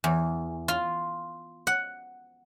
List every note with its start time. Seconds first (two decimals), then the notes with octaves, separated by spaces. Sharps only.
0.04 E2
0.68 F4
1.67 F#5